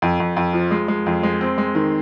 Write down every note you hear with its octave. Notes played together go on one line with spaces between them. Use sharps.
F2
F2
F2
F3
G#3
G#3
F2
G#3
C4
G#3
D#3